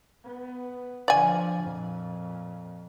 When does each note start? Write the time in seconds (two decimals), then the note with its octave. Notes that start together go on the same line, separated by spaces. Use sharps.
0.24 B3
1.08 D3 F3 D5 G#5
1.62 F2 A#2